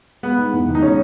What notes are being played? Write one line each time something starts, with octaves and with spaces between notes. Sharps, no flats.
G#3 B3
D#4
E2
D#3
D#4
G#3 C#4